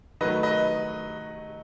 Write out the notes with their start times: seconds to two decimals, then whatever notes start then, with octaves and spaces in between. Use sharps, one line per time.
0.21 D#3 F#3 A3 B4 D#5
0.43 B4 D#5